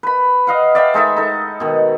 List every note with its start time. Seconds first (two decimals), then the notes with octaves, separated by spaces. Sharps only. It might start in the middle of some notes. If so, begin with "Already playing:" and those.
0.03 B4 B5
0.47 D#5 F5 F#5
0.75 D5 E5 F5 G5
0.94 G#3 D#4 A4 E5
1.17 D#4 A4
1.60 B2 D#3